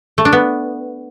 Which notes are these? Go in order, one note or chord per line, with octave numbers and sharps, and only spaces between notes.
A3
D4
B3